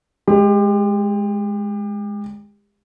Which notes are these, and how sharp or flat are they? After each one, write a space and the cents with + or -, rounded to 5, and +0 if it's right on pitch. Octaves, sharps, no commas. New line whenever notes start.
G#3 +0 G4 +30